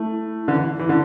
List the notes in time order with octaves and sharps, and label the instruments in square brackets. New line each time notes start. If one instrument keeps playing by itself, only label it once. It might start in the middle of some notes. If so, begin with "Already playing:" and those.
Already playing: [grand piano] A3 [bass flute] E4
[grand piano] D3
E3
E3
D3